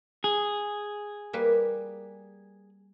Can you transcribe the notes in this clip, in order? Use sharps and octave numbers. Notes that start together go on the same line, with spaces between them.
G#4
G3 A#3 B4